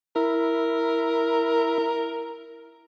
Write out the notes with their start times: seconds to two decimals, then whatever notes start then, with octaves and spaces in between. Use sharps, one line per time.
0.16 E4 A#4